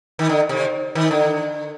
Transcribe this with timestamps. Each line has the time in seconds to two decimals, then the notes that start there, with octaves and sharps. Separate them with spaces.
0.19 D#3
0.29 D3
0.49 C3
0.95 D#3
1.11 D3